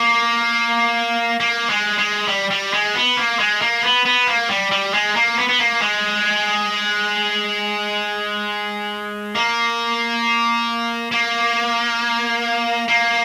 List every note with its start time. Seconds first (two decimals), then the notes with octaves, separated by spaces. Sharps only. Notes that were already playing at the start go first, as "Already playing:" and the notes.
Already playing: A#3
1.40 A#3
1.70 G#3
1.99 G#3
2.28 G3
2.50 G3
2.73 G#3
2.95 B3
3.17 A#3
3.39 G#3
3.62 A#3
3.83 B3
4.05 B3
4.27 A#3
4.50 G3
4.71 G3
4.94 G#3
5.16 A#3
5.38 B3
5.49 B3
5.60 A#3
5.82 G#3
9.35 A#3
11.12 A#3
12.88 A#3